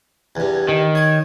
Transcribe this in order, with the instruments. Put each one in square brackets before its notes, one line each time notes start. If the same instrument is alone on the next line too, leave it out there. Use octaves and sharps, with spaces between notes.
[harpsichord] E2 G2
[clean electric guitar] D#3
[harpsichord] C#5